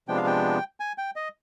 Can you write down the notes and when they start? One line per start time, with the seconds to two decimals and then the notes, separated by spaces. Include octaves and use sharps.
0.08 C3 F3 G#3 B3 D4 G5
0.17 F5
0.27 G5
0.80 G#5
0.98 G5
1.16 D#5